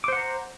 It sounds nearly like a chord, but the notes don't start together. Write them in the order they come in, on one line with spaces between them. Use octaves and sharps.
D6 C5 F#5 A#5